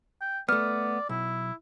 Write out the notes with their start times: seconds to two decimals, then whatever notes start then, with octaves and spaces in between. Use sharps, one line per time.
0.21 G5
0.49 A3 B3 D5 F6
1.09 B1 E4